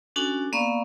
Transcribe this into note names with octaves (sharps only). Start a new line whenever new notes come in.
C#4 D4 F#4 A4 G#5
A#3 B3 D5 F5 C#6